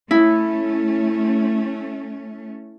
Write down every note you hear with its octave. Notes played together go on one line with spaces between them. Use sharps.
A3 C#4 E4